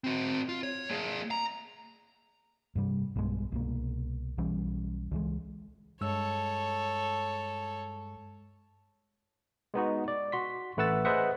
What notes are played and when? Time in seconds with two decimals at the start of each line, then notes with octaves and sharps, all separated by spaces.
0.04 C4 F#4
0.49 F4
0.63 C#5
0.91 A#3 G#4
1.31 A#5
2.75 G2 C3 G3
3.16 B1 G2 B2 G#3
3.52 C2 B2 A#3
4.38 B1 E3 G3 C#4
5.11 C#2 E3 G#3
6.01 G2 G#3 A4 C#5 E6
9.74 G#3 B3 D#4 F#4
10.08 D5
10.32 F#4 C6 B6
10.77 A1 A3 B4 F#5 E6 A6
11.05 G#4 B4 C5 D#5 E5 F#5